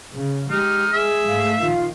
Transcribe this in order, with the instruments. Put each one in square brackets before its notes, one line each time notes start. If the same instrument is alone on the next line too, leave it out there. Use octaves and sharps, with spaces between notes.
[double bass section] C#3
[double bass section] G#3 [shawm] D#4 [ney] G4 [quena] F6
[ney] G#4 [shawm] E5
[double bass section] G#2 A3 [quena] F5
[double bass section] A#1 D#3 [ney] F4